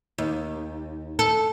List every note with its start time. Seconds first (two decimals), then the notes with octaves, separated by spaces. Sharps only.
0.18 D#2
1.19 A4